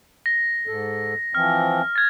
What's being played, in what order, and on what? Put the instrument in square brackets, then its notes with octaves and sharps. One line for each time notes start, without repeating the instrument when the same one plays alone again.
[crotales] A#6
[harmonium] G#2 A4
[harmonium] E3 F3 C4 [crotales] F6
[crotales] G#6 A6